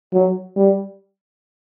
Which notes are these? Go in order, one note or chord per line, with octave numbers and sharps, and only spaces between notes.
F#3
G3